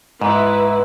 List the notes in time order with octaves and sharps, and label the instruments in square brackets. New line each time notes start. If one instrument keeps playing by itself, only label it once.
[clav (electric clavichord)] G#2 [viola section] E4 B4